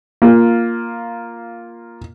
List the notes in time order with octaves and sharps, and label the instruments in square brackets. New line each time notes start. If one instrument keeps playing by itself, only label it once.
[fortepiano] A#3 F4